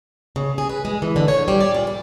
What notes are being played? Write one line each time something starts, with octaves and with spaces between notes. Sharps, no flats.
C#3
G#4
B4
G#3
E3
D3
C#5
G3
D5
A#2
G3